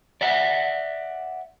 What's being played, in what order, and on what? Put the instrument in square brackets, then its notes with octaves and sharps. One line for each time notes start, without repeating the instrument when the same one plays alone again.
[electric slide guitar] D5 E5 F#5